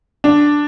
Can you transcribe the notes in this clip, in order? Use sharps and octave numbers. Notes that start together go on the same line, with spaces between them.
D4